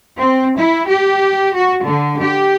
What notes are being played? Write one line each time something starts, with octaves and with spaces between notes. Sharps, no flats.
C4
E4
G4
F#4
D3
G4